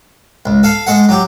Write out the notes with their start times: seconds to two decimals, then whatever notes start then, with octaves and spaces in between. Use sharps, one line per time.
0.46 C#2
0.63 A4 F5
0.87 G#3 A4 F#5
1.09 F#3 G4